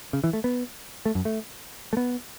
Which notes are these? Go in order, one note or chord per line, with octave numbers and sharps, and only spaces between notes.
C#3
E3
A3
B3
A3
F#2
A3
A3
B3